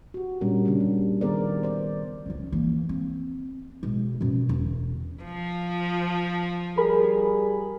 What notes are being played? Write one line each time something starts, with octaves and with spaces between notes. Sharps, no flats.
F#4 G4
A#2 G3 C#4 D4 A#4
C#3 A#3 C#4 D4
G3
D#3 B3 G#4 A#4 C5 D5
C5 D5
C#2 C#4
E3 A#3
C4
B2 G#3
F#2 B2
E1
F3
G3 G#4 A#4 B5